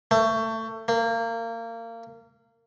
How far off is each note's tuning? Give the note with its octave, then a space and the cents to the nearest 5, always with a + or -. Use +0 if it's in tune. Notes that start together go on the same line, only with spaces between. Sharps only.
A3 +25
A#3 -25